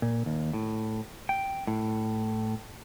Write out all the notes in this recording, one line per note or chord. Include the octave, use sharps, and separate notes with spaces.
A#2
D#2
A2
G5
A2